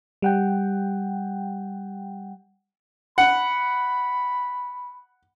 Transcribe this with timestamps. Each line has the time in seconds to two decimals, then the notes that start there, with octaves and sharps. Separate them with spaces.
0.22 G3 F#5 G5
3.18 F#5 B5